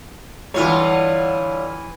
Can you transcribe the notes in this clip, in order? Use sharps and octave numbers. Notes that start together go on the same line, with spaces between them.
G2 D3 E3 F4 C#5